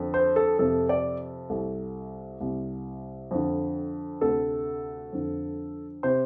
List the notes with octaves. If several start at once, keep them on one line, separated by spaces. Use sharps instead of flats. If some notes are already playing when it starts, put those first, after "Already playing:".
Already playing: F2 D3
C5
A4
F2 C3 A4
D5
C2 C3 A4
C2 C3
F2 D3
D2 C3 A4
F2 D3
C3 C5